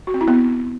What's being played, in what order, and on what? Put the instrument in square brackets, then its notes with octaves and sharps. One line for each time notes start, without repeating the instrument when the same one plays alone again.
[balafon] F#4
C4
E4
B3